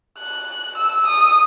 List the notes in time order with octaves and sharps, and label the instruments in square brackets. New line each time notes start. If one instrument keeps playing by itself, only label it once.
[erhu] F#6
E6
D#6